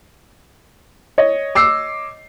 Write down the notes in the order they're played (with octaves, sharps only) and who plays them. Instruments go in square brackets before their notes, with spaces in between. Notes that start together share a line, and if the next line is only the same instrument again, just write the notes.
[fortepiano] C#5 D#5
[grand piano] D6 E6 C7